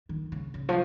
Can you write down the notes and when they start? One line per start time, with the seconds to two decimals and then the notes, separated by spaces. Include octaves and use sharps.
0.09 D#3
0.32 C#3
0.54 C#3
0.69 F3